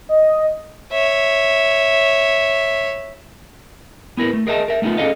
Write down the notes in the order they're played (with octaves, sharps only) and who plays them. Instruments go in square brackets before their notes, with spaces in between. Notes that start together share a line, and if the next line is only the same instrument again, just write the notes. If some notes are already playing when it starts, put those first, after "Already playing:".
[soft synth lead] D#5
[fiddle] C#5 E5
[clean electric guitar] B3 E4 A#4 B4
A3
G#4 A#4 D#5 E5 G#5 A5
A#4 E5
A3 B3 C#4 D#4 F4
C#4 G#4 A4 D5 D#5 F5